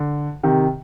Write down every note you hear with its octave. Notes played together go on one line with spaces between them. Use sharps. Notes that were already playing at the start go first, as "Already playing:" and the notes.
Already playing: D3
C3 D#3